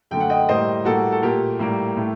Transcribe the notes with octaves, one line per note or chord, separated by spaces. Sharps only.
F#2 D3 A3 G5
F#5
D#5 G5
A2 G3 A#3 C5 D#5
A2 G3 A#3 F#4 A4
A4
A#2 A3 G4 A#4
A2 G3 A#3
A2 A3